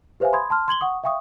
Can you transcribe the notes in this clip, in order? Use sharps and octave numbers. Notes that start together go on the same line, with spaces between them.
G4 B4 C5 E5 F5 G#5
B5 C6 D#6 G#6
A5 C6 F6
C6 G#6 F#7 G7
F#5 C#6 D#6
E5 F5 G5 C#6 D#6